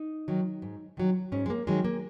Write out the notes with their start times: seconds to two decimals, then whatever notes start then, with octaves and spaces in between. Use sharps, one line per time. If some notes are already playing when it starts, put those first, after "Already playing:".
Already playing: D#4
0.28 D#3 F#3
0.62 G#2
0.97 D#3 F#3
1.32 G#2 C#4
1.46 G#3
1.50 A#3
1.67 D#3 F#3 G#3
1.84 A#3